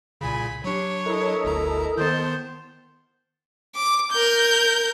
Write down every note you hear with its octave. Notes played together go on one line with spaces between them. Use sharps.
C2 A#2 C#3 G#5 B5
F#3 D4 G4 C#5
E4 A4 A#4 D#5
G1 D2 A#5
D#3 B3 C5 A5 G6
D6
A#4 G6